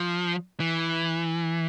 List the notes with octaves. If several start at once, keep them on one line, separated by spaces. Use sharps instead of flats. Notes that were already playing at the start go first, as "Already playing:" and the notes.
Already playing: F3
E3